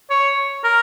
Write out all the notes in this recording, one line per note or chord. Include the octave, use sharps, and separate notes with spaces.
C#5
A#4